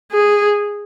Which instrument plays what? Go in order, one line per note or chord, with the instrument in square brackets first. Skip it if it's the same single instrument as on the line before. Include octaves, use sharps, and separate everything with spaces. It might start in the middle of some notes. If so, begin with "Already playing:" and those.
[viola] G#4